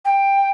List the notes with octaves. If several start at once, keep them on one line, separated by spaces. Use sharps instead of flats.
G5